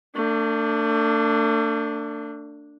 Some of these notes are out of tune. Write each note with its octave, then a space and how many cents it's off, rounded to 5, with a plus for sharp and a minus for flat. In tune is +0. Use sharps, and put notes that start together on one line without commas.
A3 +40 D4 +0